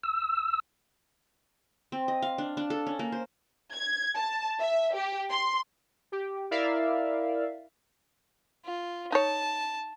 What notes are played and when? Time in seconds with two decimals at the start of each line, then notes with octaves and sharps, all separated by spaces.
0.03 E6
1.92 C4
2.08 D#5
2.22 F5
2.38 D4
2.57 D4
2.70 A4
2.86 C#4
2.99 A#3
3.12 C5
3.73 G#6
4.17 A5
4.61 E5
4.95 G4
5.30 C6
6.12 G4
6.51 E4 A#4 D5 E5 F5
8.65 F4
9.12 D#4 C#5 A5